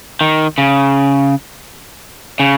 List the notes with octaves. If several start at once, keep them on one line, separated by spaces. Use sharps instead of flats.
D#3
C#3
C#3